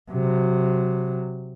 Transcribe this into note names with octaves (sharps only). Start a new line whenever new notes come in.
C3 F#3